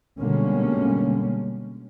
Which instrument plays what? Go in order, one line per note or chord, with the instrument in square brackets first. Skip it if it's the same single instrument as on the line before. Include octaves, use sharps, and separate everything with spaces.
[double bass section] B2 D3 G3 G#3 A#3 C#4